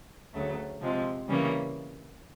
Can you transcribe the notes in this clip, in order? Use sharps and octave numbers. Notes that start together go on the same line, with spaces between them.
D2 C#3 F#3 A3
C3 F3 G#3
C#3 E3 G3 A#3 C#4